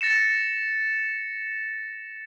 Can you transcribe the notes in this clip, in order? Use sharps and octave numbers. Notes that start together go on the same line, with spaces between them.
A6 A#6 C#7 E7